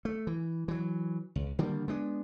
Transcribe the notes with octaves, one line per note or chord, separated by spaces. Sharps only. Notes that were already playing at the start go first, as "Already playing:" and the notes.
A3
E3
E3 F#3
C#2
D3 D#3 G3 A#3
G#3 B3 D4